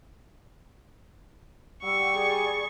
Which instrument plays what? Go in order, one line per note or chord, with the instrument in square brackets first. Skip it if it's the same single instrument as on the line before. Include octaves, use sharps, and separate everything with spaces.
[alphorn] G3 [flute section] F#5 E6 [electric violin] C#6
[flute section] G#4 D5